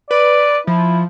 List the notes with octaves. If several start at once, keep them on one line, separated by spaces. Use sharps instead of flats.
B4 D5
F3 E4